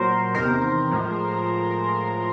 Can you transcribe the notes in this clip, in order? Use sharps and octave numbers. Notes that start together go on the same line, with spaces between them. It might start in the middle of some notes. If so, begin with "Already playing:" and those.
Already playing: A#2 F#3 A#4 C5
E2 C3 D#3 A#4 C5
A2 F3 G#3